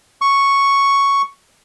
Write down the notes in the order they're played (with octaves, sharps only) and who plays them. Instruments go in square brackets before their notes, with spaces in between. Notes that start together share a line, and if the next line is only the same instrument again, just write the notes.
[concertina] C#6